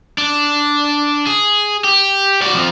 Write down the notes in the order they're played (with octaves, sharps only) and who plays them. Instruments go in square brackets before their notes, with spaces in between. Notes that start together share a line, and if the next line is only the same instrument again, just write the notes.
[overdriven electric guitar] D4
G#4
G4
F#4 D5
F2 F3